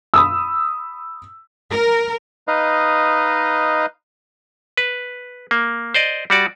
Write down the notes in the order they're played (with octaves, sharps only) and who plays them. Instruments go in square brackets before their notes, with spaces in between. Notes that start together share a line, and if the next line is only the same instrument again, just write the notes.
[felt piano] B5 D#6 E6
[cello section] A#4
[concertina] D#4 B4 D#5 F5
[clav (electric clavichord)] B4
A#3
C5 D5 D#5
G3 F#4 D5